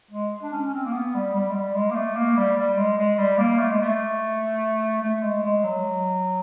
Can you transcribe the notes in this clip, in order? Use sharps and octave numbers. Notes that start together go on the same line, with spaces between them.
G#3
D4
C#4
C#4
C4
A#3
B3
G3
G3
G#3
G3
G#3
A#3
A3
A#3
G3
G3
G#3
G#3
G3
A#3
A3
G#3
A3
A3
G#3
G#3
F#3